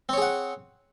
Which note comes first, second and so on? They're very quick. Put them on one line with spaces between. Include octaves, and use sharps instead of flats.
C4 C#5 G#4 F#5